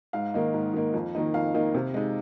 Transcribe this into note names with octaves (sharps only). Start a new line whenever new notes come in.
G#2 F5
D#3 A#3 D#4
G#2
D#3 A#3 D#4
F2
D#3 A#3 D#4
F2 F5
D#3 A#3 D#4
C3
G#3 D#4